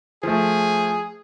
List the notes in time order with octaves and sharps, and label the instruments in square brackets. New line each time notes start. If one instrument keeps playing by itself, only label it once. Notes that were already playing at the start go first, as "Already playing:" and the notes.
[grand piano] F3 A3 [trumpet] G#4